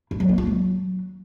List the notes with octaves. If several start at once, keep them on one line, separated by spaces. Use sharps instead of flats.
E4
F#3
A#3
F4
F#3